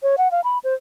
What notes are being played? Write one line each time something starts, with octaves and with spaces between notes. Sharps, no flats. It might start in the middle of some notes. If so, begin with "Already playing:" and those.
C#5
F#5
F5
B5
C5